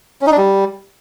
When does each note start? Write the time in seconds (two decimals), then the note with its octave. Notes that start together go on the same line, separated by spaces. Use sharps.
0.21 C#4
0.27 D#4
0.32 D4
0.38 G3